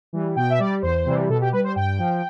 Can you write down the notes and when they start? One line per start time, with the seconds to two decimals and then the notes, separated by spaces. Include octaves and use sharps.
0.13 E3 G3
0.36 B2 G5
0.50 E5
0.59 G3 D5
0.82 E2 C5
1.06 C3 E3 G3
1.29 B2 A4
1.41 G4
1.52 G3 B4
1.64 C5
1.76 G2 G5
1.99 F3